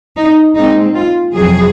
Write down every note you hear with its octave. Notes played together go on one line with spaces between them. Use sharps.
D#4
A#2 G#3 C4 D#4
F4
F2 C3 F#3 G#4